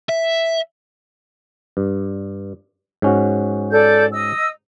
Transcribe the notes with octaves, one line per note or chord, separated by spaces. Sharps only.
E5
G2
G#2 C#4 F#4
A4 D5 G6
D#5 E6